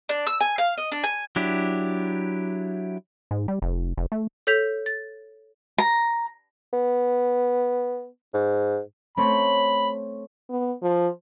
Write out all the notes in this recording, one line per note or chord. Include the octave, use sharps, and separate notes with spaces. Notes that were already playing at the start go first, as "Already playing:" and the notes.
D4
E6
G#5
F5
D#5
D4
G#5
F#3 D4 E4 G4
G#2
G3
F1
F1
A3
A4 C#5 G6 B6 F7
A6
A#5
B3
G#2
A3 C4 C#5 B5
B3
F3